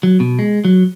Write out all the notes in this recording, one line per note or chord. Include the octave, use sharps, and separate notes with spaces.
F#3
B2
G#3
F#3